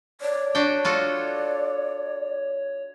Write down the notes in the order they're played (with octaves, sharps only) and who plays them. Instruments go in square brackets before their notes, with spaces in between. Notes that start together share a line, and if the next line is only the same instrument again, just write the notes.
[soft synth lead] C#5 [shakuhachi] D5
[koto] D4 F#4 G5
[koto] F4 F#4 A4 [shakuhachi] D5